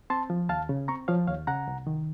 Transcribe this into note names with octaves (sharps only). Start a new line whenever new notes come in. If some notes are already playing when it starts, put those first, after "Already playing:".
C4 A5 C6
F3
D#2 F5 A5
C#3
C4 A#5 C#6
F3 C#5 F5
D#2 C#5 F5
C#3 F#5 A#5
C2
D#3